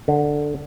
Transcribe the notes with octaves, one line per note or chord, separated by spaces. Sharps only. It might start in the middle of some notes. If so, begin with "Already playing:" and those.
D3